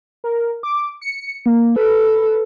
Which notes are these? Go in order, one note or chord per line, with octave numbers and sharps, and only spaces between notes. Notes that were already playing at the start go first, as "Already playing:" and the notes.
A#4
D6
C#7
A#3
A4 B4